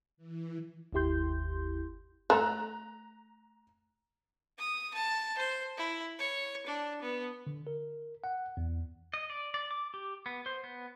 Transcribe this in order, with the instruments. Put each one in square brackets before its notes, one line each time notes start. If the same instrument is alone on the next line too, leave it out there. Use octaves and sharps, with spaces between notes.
[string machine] E3
[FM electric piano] G1 D#2 E4 G4 C6 G6
[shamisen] A3 [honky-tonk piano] A#5 F#6
[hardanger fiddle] D#6
A5
C5
E4
C#5
D4
B3
[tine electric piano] D3
A#4
F#5
E2
[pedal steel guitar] D#5
D5
D5
D6
G4
B3
C5
B3